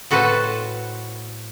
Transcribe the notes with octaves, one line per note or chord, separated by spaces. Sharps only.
A2 F#4 A4 B4 C5 A5